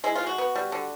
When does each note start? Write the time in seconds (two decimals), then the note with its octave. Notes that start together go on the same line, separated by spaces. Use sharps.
0.04 G#3 E4
0.15 F4
0.21 G#3
0.27 F#4
0.38 B3
0.55 G3
0.72 D3